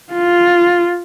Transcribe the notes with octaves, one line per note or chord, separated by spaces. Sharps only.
F4